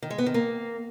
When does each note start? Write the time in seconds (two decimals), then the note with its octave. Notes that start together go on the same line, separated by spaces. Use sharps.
0.02 D#3
0.10 G#3
0.18 B3
0.26 D#3
0.34 A#3